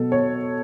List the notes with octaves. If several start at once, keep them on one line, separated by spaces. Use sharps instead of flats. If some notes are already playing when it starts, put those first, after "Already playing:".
Already playing: B2 F#3 A4
C#5